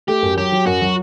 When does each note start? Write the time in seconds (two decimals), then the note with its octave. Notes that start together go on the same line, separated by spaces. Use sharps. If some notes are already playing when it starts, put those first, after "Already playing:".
0.08 A3 G4
0.22 F#2
0.37 F#3 G4
0.52 F#3
0.66 F#2 F#4
0.82 F#3